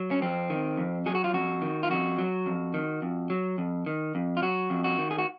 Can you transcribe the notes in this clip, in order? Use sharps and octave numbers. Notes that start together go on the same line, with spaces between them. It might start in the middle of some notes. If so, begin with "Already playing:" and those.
Already playing: F#3
C#4
F2 C4
D#3
F2
F#3 G#4
F#4
F4
F2 F#4
D#3
F4
F2 F#4
F#3
F2
D#3
F2
F#3
F2
D#3
F2
F4
F#3 F#4
F2
F#4
D#3
G#4
F#4